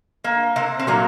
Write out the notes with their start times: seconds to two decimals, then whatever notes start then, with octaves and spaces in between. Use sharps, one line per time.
0.24 A#3
0.56 C3 C4
0.79 C4
0.87 A#2 F#3 A#3